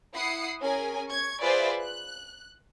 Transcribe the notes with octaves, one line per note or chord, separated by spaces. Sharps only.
E4 F#5 D#6 C7 C#7
C#4 G#4 A#4 G#5
C#6 G#6
F4 G#4 B4 C5 D5 E5
F#6